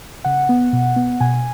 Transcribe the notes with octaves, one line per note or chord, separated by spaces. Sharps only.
C#3 F#5
B3
B2
B3
B2 G#5